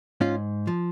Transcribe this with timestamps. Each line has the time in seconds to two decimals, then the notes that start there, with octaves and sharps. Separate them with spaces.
0.21 G#2 C#4 F4
0.67 F3